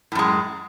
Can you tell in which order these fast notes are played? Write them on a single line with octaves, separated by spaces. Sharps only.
A2 F#2 G#3